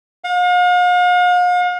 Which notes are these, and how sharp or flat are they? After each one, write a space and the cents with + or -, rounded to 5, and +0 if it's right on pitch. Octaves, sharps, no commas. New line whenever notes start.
F5 +45